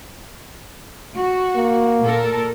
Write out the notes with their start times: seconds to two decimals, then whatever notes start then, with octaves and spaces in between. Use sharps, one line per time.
1.15 F#4
1.56 A#3
2.02 A#2 A4 A#4